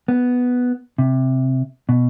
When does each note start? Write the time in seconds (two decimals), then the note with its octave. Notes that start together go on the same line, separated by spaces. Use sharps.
0.08 B3
0.98 C3
1.89 B2